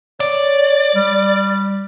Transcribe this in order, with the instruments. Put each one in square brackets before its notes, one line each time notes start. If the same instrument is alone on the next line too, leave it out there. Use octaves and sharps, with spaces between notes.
[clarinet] C#5 [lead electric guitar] D5
[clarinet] G3